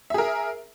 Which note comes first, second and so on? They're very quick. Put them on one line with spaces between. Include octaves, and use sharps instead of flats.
E5 G#4 A#4